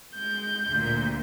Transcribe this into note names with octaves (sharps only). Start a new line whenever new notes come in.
G#3 G6
D2 A#2